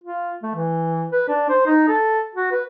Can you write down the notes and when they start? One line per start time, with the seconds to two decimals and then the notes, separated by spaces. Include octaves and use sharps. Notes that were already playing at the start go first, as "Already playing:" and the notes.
0.04 F4
0.43 A3
0.55 E3
1.12 B4
1.28 D4
1.49 C5
1.66 D#4
1.88 A4
2.35 F#4
2.51 B4